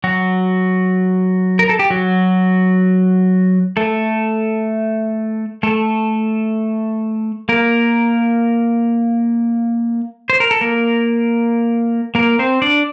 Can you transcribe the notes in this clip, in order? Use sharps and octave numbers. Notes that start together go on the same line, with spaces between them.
F#3 F#4
A#4
A4
G4
F#3 F#4
A3 A4
A3 A4
A#3 A#4
C5
A#4
A4
A#3 A#4
A#3 A#4
C4 C5
D4 D5